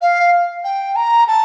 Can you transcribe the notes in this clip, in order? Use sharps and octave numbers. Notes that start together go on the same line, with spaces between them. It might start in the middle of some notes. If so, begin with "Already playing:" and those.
F5
G5
A#5
A5